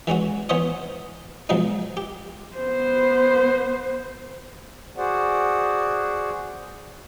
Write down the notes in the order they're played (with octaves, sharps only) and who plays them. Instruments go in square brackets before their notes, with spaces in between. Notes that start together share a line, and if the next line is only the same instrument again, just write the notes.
[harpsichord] E3 G#3 C#4 F#4
E3 B3 C5 C#5 D#5
B2 F3 F#3 G#3 D#4
G4
[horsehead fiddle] B3 C5
[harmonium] F#4 G#4 C5 D5 F#5